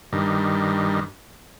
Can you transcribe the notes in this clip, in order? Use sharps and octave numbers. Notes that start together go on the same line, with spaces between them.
G2 D#3